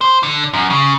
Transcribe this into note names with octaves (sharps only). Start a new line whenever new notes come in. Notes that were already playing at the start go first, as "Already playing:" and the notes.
C5
D3
F#2
C#3